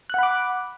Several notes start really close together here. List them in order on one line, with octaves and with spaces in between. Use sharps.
F#6 F#5 B5 D6